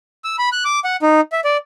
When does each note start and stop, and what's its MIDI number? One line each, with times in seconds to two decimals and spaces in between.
0.24 0.36 88
0.39 0.49 83
0.52 0.64 90
0.65 0.80 86
0.84 0.96 78
1.02 1.21 63
1.32 1.40 76
1.44 1.57 74